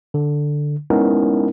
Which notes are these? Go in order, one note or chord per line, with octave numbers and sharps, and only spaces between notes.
D3
G#3 B3 C#4 D#4 E4 A#4